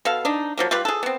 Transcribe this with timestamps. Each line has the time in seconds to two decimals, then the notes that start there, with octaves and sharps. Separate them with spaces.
0.05 B2 A4 F5
0.25 D4 D#4
0.57 F3 F#3 A#3
0.71 G3 F4 G4 B4
0.85 G#4 A4
1.03 B3 C4